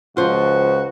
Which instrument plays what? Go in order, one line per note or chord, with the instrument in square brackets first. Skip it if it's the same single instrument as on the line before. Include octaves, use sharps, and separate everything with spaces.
[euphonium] C#2 [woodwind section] F3 [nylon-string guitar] F4 C5 [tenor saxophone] F#4